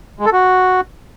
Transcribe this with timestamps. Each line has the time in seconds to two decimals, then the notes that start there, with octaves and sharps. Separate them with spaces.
0.19 G#3
0.26 A4
0.32 F#4